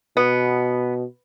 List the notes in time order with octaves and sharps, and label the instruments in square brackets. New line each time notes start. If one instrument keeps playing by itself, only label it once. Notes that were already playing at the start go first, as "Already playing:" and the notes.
[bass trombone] B2 [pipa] B3